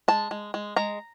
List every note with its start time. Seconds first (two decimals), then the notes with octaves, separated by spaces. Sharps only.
0.08 G#3 A5
0.31 G#3
0.54 G#3
0.76 G#3 A#5